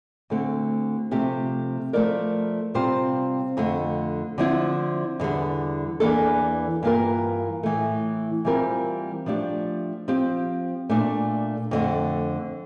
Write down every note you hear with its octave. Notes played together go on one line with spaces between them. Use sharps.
D2 D3 A3 C4
C3 F3 A3 C4 G4
F3 A3 E4 A#4 D5
C3 G3 C4 F4 C5
F2 D3 A3
D3 F3 C4 E4
E2 D3 G3
E2 E3 A#3 D4 A4
G2 E3 A#3 F4 A#4
A2 E3 A3
E3 G3 C4 F4 A#4
F3 A3 D4 G4 D5
F3 C4 G4
A#2 A3 D4
F2 D3 A3